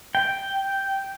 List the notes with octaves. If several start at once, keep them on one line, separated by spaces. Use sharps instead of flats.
G5